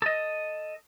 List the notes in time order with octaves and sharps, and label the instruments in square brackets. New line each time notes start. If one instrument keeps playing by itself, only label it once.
[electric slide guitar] A4 D#5